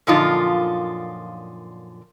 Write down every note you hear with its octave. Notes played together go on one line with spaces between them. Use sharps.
F#2 A#2 D3 F3 D#4 F4